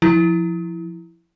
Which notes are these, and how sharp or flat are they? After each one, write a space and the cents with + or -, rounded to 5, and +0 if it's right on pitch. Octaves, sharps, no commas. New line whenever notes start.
F3 +0 E4 +0